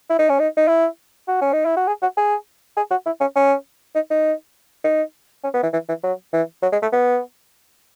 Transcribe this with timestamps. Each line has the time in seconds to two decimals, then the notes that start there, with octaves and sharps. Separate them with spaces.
0.10 E4
0.19 D#4
0.29 C#4
0.39 D#4
0.57 D#4
0.68 E4
1.28 F#4
1.41 C#4
1.53 D#4
1.65 E4
1.76 F#4
1.87 G#4
2.02 F#4
2.17 G#4
2.77 G#4
2.91 F#4
3.06 E4
3.21 C#4
3.36 C#4
3.95 D#4
4.10 D#4
4.84 D#4
5.44 C#4
5.54 B3
5.63 E3
5.73 E3
5.89 E3
6.03 F#3
6.33 E3
6.63 F#3
6.72 G#3
6.82 A3
6.92 B3